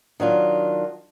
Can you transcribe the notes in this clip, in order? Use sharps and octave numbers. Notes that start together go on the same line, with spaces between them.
D#3 F#3 D4 F4